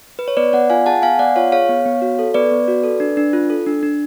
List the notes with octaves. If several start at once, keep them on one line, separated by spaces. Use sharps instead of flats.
B4
C#5
B3 B4 D5
B3 D5 F#5
F4 F5 G#5
G#4 F#5 A5
B3 F5 G#5
B3 D5 F#5
F4 C#5 F5
G#4 C#5 F5
B3
B3
F#4
A4
B3 B4 D5
B3
F#4
A4
D4
D4
F4
A4
D4
D4